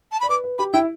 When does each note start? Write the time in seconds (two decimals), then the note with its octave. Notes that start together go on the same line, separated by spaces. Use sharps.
0.12 A5
0.20 D5 B5
0.29 B4 D6
0.44 B4
0.59 G4 B5
0.73 E4 G5